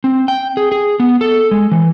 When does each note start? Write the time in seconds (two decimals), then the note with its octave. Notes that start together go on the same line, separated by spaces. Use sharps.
0.04 C4
0.28 G5
0.57 G#4
0.72 G#4
1.00 B3
1.21 A4
1.51 G#3
1.72 E3